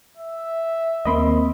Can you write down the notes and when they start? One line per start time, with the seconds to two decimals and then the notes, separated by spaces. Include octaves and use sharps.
0.17 E5
1.06 D#2 A#3 C4 D#5 B5 C6